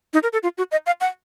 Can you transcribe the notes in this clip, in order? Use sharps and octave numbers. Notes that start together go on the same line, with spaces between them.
D#4
A#4
A4
F4
F#4
D#5
F5
F#5